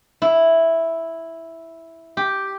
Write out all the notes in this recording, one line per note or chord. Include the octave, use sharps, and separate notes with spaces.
E4
G4